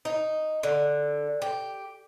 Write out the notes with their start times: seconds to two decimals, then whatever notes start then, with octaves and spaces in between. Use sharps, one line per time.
0.05 D#4
0.63 D3
1.42 G4